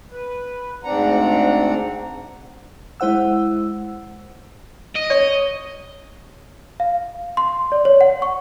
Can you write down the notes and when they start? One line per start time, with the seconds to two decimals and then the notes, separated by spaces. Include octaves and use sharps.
0.11 B4
0.84 D2 G#2 C4 D4 F#5 A#5
3.00 G#3 E4 C5 F#5 E6
4.95 D#5
5.10 C#5
6.80 F5
7.37 C6
7.72 D5
7.85 C#5
8.01 F#5
8.22 C#6